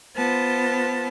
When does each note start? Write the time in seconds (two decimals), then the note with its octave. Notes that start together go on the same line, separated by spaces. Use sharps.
0.16 B3 F4 C5 A5